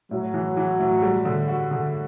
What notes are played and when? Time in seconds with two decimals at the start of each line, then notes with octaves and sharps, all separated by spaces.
0.11 A2 F#3
0.34 E3
0.57 E3
0.79 A2
1.02 G3
1.25 D3
1.48 F#4
1.71 D3